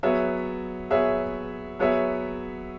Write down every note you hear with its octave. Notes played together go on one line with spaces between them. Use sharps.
F#3 B3 G#4 C#5 E5
F#3 B3 G#4 C#5 E5
F#3 B3 G#4 C#5 E5